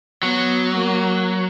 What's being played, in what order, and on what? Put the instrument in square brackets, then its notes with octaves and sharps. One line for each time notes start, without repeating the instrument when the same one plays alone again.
[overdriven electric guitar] F#3 [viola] B3
[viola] A#3